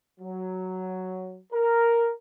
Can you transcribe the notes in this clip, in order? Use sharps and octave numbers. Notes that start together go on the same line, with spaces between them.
F#3
A#4